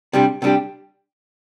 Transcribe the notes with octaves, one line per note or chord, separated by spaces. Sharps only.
C3 G3 D4 G4
C3 G3 D4 G4